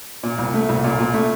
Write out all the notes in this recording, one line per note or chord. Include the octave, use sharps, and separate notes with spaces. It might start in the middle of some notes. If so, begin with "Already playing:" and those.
A#2
C2
A3
C2
A#2
A#2
A3